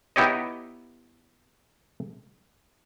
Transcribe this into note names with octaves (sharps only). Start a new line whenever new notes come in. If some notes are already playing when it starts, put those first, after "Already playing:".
B3 D#4 E4 G4 C#5 D#5